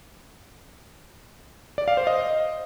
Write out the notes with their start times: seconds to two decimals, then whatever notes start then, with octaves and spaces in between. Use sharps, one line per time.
1.78 D5
1.88 F5
1.97 C5
2.07 D#5